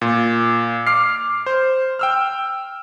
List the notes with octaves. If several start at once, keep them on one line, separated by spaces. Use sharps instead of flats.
A#2
D6 F6 C7
C5
G5 E6 F6